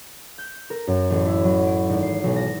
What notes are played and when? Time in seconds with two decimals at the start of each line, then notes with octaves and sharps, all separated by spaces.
0.38 G6
0.70 A#4
0.87 F#2
1.10 A1
1.26 E4
1.44 F#3
1.67 D7
1.89 G#1
2.02 C7
2.24 B1
2.36 A#6